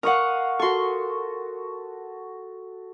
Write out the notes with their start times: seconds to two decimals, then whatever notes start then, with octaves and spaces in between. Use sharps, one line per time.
0.03 A#4 F5 F#5 C#6 D#6
0.59 F#4 A4 C6 C#6